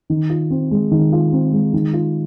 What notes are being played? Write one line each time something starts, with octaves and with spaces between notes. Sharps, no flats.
D#3
F4
C4
G#3
D#3
F4
C4
G#3
D#3
F4